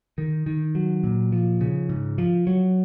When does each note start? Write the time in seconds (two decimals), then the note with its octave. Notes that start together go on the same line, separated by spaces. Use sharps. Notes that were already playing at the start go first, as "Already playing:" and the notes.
0.18 D#3
0.46 D#3
0.75 F#3
1.04 A#2
1.32 F3
1.61 C#3
1.89 G#2
2.18 F3
2.47 F#3